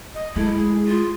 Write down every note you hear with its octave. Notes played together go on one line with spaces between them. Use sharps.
D#5
G#3 A3 E4
G#4
F4